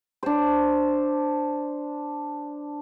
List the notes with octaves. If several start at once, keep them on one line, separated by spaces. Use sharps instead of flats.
D4 C5